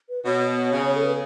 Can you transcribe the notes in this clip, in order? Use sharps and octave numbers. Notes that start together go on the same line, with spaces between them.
B4
B2 C#5
C#3
A4
B4